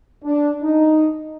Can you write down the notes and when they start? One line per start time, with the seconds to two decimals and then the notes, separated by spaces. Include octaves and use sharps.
0.23 D4
0.62 D#4